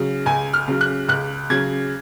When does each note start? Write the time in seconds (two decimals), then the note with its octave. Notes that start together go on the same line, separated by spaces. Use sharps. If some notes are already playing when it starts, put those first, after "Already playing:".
Already playing: C#3 F#3
0.26 C#2 G#5
0.53 F6
0.68 C#3 F#3
0.81 F#6
1.08 C#2 F#6
1.50 C#3 F#3 G#6